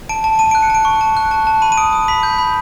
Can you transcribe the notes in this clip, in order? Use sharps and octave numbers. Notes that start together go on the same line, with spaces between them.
A5 D7
A5
A5 D#7
F#6 D7
C#7
A5 D7
C#6
A5
F#6
A5
A5
B5 D#7
D#7
D#6 D7
D#6
B5 B6
G6
B5